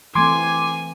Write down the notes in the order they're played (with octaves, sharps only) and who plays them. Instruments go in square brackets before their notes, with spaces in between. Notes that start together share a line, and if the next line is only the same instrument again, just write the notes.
[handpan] E3 A3 C4 [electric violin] G#5 [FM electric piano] C6 D6 G#6